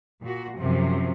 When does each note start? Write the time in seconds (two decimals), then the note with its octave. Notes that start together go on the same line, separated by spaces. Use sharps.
0.23 A#2 F#4
0.59 F#2 C3 F3